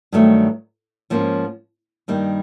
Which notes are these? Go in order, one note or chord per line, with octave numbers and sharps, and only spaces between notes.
G2 D#3 F#3 A3
G#2 F3 A#3 C#4
G2 D#3 G3 A#3 D#4